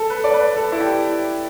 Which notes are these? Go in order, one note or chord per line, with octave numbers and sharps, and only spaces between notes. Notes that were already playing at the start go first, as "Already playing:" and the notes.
Already playing: A4
B4
D5
B4
A4
E4
G4